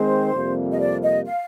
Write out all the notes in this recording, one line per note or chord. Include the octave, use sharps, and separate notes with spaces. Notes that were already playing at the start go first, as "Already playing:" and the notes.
Already playing: D#3 G#3 C4 C5
F2 C3 G3 A#3
D#5
D5
D#5
F5